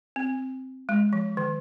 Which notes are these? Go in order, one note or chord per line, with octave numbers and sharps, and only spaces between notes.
C4
G#3
F3
D#3